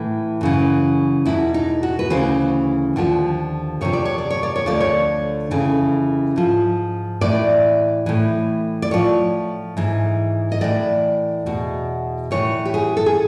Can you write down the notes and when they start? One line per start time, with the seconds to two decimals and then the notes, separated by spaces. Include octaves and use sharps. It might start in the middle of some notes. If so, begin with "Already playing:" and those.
Already playing: A2 E3
0.41 F#2 C#3 E3
1.25 E2 B2 E4
1.54 D#4
1.83 F#4
1.99 B4
2.10 D2 C#3 E3 C5
2.96 D#2 D3 F3
3.81 E2 C3 F3 C#5
3.93 D5
4.05 C#5
4.18 D5
4.30 C#5
4.43 D5
4.56 C#5
4.66 D2 D3 F3 D5
4.80 C#5
5.51 F2 C#3 E3
6.36 G#2 F3
7.21 A2 E3 D5
8.06 A2 E3
8.82 D5
8.91 A2 F3 C#5
9.77 G#2 E3
10.52 D#5
10.61 A2 E3 D5
11.46 E2 B2
12.31 A2 E3 C#5
12.65 G4
12.74 G#4
12.97 A4
13.06 G#4